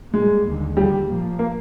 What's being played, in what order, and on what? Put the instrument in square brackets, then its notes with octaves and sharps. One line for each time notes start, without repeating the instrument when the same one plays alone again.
[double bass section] A#2 G3 A#3 [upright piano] G#3
[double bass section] D#2 D3 G#3
[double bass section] D#2 D3 F3 [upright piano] G3
[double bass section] A#2 F3 A#3
[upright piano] A#3